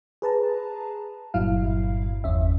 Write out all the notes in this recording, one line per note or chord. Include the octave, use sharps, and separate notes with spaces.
G#4 B4 A5 A#5
G1 G2 A#2 F#3 E4 F5
G1 E2 C#4 E5